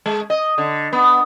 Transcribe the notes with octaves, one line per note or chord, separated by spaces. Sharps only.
G#3
D#5
D3
B3